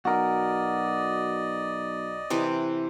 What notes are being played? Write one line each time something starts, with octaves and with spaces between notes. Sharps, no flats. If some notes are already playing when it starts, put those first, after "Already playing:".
B1 F#4 A#4 D5 D#5
C3 E3 B4